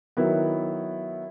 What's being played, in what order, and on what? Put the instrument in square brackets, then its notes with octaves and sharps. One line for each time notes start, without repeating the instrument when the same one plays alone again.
[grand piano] D#3 F#3 B3 E4